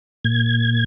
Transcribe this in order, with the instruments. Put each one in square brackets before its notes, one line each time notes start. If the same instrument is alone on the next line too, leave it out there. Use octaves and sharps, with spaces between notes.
[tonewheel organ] A#2 G#6